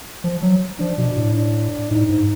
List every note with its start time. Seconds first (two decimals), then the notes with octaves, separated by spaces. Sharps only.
0.24 F3
0.43 F#3
0.80 F3 D4
0.98 B2
1.17 A2
1.35 D4
1.90 A2 D#4
2.09 G#2